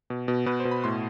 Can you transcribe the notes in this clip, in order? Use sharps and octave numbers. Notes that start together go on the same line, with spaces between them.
B2
B2
B2 B4
C5
B2
B5
A2 C6